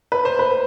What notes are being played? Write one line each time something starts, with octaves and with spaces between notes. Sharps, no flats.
B4
C5
B4